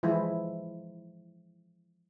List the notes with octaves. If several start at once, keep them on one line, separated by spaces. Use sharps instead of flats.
E3 F3 G#3 E4